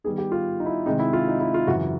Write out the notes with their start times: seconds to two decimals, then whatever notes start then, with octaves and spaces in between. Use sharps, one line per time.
0.04 D#3 G3 B3 D#4 G#4
0.18 G4
0.32 F4
0.60 D#4
0.66 E4
0.86 C3 D#3 G#3 C4 D#4
0.99 E4
1.13 F4
1.27 D#4
1.40 E4
1.54 F4
1.67 F#2 C#3 E3 F#4